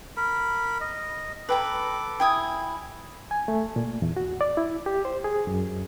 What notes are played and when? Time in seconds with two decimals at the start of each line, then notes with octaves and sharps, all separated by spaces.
0.17 A#4 B5
0.81 D#5
1.49 A4 B4 G5 A#5 D6
2.20 E4 G5 G#5 D#6
3.31 G#5
3.48 A3
3.76 A#2
4.02 E2
4.16 F#4
4.41 D5
4.57 E4
4.86 G4
5.05 C5
5.24 G#4
5.47 F#2